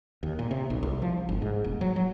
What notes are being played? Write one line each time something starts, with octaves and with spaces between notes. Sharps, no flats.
D#2
A#2
C3
B1
C2
F3
G1
G#2
D#1
F#3
F#3